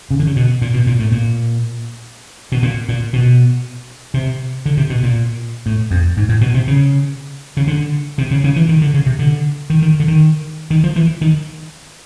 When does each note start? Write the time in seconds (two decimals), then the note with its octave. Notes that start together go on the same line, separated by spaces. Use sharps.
0.11 C#3
0.19 D3
0.27 C#3
0.36 B2
0.62 A#2
0.74 B2
0.87 A#2
0.99 A2
1.12 A#2
2.52 B2
2.63 A#2
2.89 A#2
3.13 B2
4.14 C3
4.66 D3
4.77 C3
4.90 B2
5.03 A#2
5.66 A2
5.91 F2
6.17 G#2
6.29 A2
6.41 B2
6.54 C3
6.67 C#3
7.57 C#3
7.67 D3
8.18 C3
8.31 C#3
8.44 C#3
8.56 E3
8.69 D#3
8.81 D3
8.94 C#3
9.06 C3
9.19 D3
9.70 D#3
9.82 D#3
10.00 D3
10.08 D#3
10.70 D#3
10.84 F3
10.96 E3
11.21 D#3